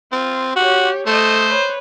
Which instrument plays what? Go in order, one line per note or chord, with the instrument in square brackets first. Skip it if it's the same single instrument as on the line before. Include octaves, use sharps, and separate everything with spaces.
[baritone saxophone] C4 [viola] F4
[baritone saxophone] F#4 [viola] G4 C#5
[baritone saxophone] A3 [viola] A4 D#5 [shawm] C5
[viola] B4 C#5